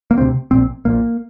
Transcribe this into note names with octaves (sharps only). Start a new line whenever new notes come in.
A#3
D2 C3 C4
A#1 A#2 C4
A#1 A#2 A#3